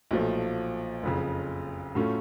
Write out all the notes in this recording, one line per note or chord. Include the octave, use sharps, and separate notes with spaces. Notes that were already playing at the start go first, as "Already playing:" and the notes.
B1 A#2 F3 A3
F#1 F2 C#3
A2 F#3 A3 C#4 F4